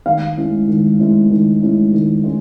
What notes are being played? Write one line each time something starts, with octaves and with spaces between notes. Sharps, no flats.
D#3 F5
G#3 C#4 E4
D#3
G#3 C#4 E4
D#3
G#3 C#4 E4
D#3
G#3 C#4